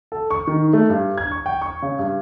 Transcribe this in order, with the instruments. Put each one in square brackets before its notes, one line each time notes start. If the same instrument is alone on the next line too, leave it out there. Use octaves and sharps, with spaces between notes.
[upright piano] A4
C#6
D#3
A3
G2
G#6
C#6
G5
C#6
C#3
G2